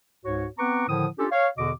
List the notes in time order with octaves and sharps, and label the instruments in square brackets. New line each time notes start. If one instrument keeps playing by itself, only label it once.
[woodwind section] C#2 G#2 F#4 C#5
B3 C4 B4 A#5 C#6 D6
A2 D3 D#3 F3 E4 D#6
C#4 D4 F4 G4 A4
C#5 F5
E2 B2 D3 F#4 D#5 D6